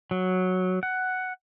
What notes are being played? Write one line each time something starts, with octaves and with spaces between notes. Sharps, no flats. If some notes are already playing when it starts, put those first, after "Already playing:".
F#3
F#5